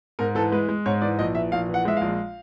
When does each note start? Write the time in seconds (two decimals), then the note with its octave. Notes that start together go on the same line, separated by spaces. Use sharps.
0.19 G#2 A#4
0.35 E3 A4
0.52 G#3 B4
0.69 G#3
0.86 G#2 C#5
1.02 E3 D5
1.19 A#1 D#5
1.35 E3 E5
1.52 A#1 F5
1.69 E3
1.74 F#5
1.85 G#3 E5
1.97 A#1 F5